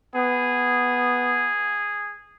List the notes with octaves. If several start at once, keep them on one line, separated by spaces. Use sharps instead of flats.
B3 G#4